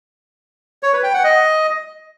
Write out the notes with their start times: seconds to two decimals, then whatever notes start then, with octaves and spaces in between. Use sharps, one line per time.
0.83 C#5
0.93 B4
1.03 G5
1.14 F#5
1.24 D#5